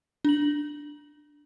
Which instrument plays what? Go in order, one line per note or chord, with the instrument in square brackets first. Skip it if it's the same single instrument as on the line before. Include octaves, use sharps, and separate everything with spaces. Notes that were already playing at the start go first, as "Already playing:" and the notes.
[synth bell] D4 F#7